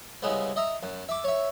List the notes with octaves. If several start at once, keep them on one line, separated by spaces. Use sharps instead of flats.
C2 C#3 G#3 B3
D#5 E5 A#5
F#2
E5 D6
C#5 E5